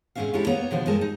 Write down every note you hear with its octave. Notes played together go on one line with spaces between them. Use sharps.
G#2 C3 D#3 C#4 E5 F5
G#3 C#4 D4 E4 G4 A4
A#3 B3 C#5 A#5
B2 D3 F3 B3 C5
G2 F3 G#3 A4 A#4 A5
D#4